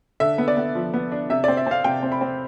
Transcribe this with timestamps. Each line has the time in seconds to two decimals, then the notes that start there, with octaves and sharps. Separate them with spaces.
0.20 D3 E5
0.38 B3
0.48 D5
0.57 B3
0.75 F3
0.94 B3
1.12 D4
1.30 C3 E5
1.44 C4 D5
1.57 E5
1.67 C4 F5
1.84 C3 G5
2.03 C4
2.12 B5
2.21 C4